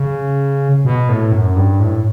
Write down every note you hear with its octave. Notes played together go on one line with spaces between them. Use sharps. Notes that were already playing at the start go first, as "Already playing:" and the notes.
Already playing: C#3
B2
A2
F#2
G2
A2